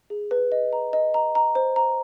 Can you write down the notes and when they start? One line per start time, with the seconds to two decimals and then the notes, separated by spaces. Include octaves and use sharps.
0.10 G#4
0.31 B4
0.52 D#5
0.73 A#5
0.93 D#5
1.14 A#5
1.35 A#5
1.55 C5
1.76 A#5